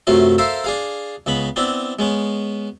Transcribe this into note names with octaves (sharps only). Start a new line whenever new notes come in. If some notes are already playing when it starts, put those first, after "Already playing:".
F#2 C3 F#3 A3 F4
A4 A#4 C5 E5 F5
D4 G#4 F5
C#2 C#3 B3 B5
B3 C4 D4 E4
G#3 B3 C#4